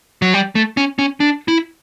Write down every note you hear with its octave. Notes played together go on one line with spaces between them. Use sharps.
F#3
G3
A3
C#4
C#4
D4
E4